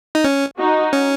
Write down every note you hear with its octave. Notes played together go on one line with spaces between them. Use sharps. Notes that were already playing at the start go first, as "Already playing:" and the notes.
D#4
C#4
D#4 F#4
C#4